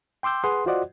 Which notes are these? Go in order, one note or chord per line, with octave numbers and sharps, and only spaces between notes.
G5 C6 D6 E6 G6
G#4 B4 F#5 C6 D#6
F4 F#4 C5 D5 D#5 F#5